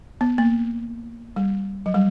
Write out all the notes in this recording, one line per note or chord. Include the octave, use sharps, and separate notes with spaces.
B3
A#3
G3
F#3
G3